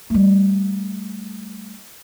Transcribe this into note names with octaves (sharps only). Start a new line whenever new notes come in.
G3 A3